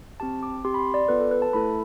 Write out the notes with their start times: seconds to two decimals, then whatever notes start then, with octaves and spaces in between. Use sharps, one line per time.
0.20 C4 G4 A5
0.43 D6
0.64 C4 G4 C6
0.74 B5
0.79 C6
0.94 D5
1.08 B3 F4 A4 B4
1.21 A4
1.31 B4
1.42 A5
1.53 A3 E4 A4 B5